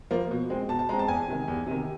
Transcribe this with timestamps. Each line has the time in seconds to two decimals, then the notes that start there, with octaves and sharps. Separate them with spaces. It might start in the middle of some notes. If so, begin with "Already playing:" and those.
0.11 F3 A#3
0.31 B2
0.50 G#3 C4
0.69 B2 A5
0.79 A5
0.89 G#3 C4 A#5
0.99 A5
1.08 E2 G#5
1.28 C3 D#3
1.48 E2
1.67 C3 D#3